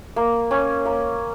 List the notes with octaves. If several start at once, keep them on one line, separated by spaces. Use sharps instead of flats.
A#3
C#4
A#3